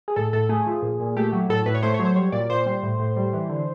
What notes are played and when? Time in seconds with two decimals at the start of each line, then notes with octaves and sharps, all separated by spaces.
0.08 G#4
0.16 A2 A4
0.33 A2 A4
0.49 A3 G#4
0.67 F3
0.82 A#2
1.00 A#2
1.17 A3 G4
1.33 F#3
1.49 A2 A4
1.66 A2 B4
1.75 C#5
1.83 A3 C5
1.94 C#5
2.00 F#3
2.05 C5
2.16 G3 C#5
2.32 A#2 D5
2.50 A#2 C5
2.66 G3
2.83 A2
3.00 A2
3.16 G3
3.33 E3
3.49 D3